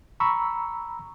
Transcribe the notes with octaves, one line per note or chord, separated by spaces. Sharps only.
A#5 B5 C#6 E6